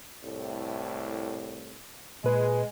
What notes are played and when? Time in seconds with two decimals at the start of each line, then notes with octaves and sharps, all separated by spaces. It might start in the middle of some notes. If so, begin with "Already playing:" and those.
0.24 C2 A2
2.24 A#2 G#3 B4